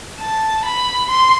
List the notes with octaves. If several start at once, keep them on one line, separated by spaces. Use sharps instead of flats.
A5
B5
C6